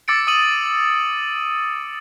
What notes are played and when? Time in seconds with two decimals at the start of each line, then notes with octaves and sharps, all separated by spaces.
0.08 D6 E6 A6 C#7 D7
0.27 D#6 D#7 F#7